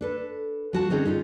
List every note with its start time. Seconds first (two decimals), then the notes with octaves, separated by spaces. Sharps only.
0.01 D4 A4 B4
0.73 F3 F#4 A5
0.90 D3 C4 C#4 D#4 G#4 A4
1.05 C#4 D#4 F4